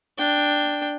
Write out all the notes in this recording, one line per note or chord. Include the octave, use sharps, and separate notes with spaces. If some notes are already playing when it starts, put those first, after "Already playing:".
D4 G5